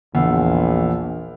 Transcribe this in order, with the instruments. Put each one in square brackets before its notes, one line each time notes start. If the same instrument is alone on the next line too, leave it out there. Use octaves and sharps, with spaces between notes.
[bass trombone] A#1 [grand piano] E2